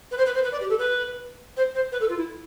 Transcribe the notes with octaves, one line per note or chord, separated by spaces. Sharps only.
B4
C5
B4
C5
B4
D5
G4
A4
B4
C5
C5
B4
A4
F4
E4